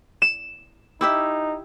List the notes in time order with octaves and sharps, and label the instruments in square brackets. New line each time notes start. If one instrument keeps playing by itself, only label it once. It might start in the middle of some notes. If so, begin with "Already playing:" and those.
[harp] E7
[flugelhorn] D#4 [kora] E4 G4 E5